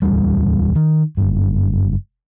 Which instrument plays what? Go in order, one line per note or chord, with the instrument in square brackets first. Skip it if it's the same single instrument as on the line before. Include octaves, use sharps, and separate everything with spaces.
[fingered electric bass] D1 G1 E2 G3
D#3
F#1 G2